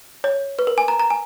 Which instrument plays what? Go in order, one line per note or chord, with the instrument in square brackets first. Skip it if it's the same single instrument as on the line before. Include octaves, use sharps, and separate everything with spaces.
[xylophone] C#5
B4
A#4
G#5
A#5
A#5
G#5